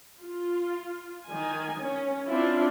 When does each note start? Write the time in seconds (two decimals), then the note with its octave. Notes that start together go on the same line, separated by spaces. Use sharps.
0.23 F4
1.29 D#3 G#5
1.81 C#4
2.28 C4 D4 E4 F4